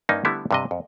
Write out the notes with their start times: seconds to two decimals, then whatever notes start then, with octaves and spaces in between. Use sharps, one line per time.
0.09 G2 A#3 C#4 D#4
0.25 D3 G3 A3 B3 E4
0.51 G2 C3 D#5
0.71 F2